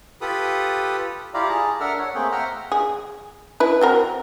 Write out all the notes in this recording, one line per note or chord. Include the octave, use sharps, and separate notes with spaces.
F4 G4 A4 B4 B5 D#6
E4 F4 G4 D5 F5 A#5
G#4 A5 A#5
D4 A4 A#4 E5 F#5 F6
C#5 F#5
A3 A#3 C4 G#4 G5
E5 F#5 G5 A#5 F6
G#4
E4 B4
F#3 C4 A#4